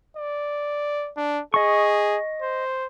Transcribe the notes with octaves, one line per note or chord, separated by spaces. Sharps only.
D5
D4
G#4 D#5 C#6
C5